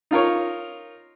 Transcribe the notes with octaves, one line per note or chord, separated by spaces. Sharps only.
D#4 F4 A#4 C#5